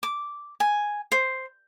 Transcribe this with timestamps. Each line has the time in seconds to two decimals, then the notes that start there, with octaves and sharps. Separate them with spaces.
0.03 D6
0.60 G#5
1.12 C5